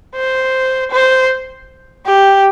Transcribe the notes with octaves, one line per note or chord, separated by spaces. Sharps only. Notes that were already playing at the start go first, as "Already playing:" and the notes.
C5
C5
G4